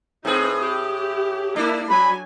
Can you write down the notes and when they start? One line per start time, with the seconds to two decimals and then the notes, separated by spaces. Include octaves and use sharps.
0.25 A2 C4 D#4 G#4 B4
0.60 G4
1.56 A#3 D4 E4
1.90 F#3 G#5 B5